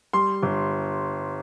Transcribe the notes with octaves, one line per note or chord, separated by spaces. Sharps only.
G3 C6
G1